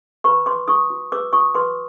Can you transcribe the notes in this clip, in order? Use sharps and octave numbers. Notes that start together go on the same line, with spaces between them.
B4 B5 C#6
B4 C6 D6
D#4 C#6 D#6
F#4
B4 D6 E6
F#4 C#6 D#6
B4 C6 D6